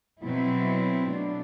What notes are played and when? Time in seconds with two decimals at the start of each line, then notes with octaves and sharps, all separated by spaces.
0.23 B2 F#3 C4 E4
1.10 B2 A3 D4